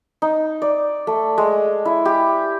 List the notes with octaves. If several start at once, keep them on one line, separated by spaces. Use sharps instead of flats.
D#4
D5
A3
G#3
E4
G4